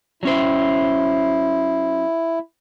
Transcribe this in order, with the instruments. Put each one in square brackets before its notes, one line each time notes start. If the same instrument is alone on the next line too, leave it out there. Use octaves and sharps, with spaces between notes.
[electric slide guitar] F#3 C#4 C5 [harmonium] E4